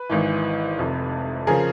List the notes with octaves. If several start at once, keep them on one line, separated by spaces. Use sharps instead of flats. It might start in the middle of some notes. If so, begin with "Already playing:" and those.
Already playing: B4
G#1 G#2 E3
F1 F2 C3
C#3 F3 G#4 A#4